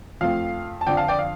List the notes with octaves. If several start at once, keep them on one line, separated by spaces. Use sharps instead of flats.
F2 F3 A3 C4 F5
A5
F2 D3 F3 C4 D5 G5
F5 A5
D5 G5
F5